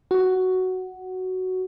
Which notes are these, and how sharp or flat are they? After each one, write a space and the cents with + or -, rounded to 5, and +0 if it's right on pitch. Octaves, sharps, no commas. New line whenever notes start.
F#4 +5